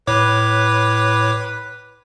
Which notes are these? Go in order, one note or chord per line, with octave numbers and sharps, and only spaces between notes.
A2 B4 C#5 D6